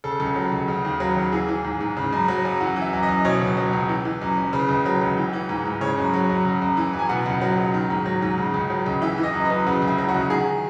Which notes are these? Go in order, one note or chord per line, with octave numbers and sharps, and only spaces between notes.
C#3 A4
C#2
F#3
C#2
C#3
D#2
F#3
D#2
E3 G#4
E3
G#2
G#2
C#3
F#2
F#3
F#2
E3 F#5
E3
E5
F#2
D#5
F#2
B2 C#5
C#2
F#3
C#2
E3
E3
F#2
F#2
C#3 B4
C#2
F#3
C#2
E3
E3
G#2
G#2
C#3 C#5
F#2
F#3
F#2
C#3
F#2
E3
F#2
G#5
B2 F#5
C#2
F#3
C#2
D#3
G#2
F#3
G#2
C#3
C#2
F#3
C#2
E3 E5
E3
D#5
F#2
B4
F#2
C#3 F#4
C#2
E4
F#3
F#4
C#2
D#3 G#4